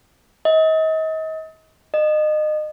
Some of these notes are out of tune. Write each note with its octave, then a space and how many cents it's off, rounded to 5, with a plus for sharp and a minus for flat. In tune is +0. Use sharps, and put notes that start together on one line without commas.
D#5 +35
D#5 -30